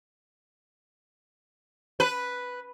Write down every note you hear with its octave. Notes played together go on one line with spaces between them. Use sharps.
B4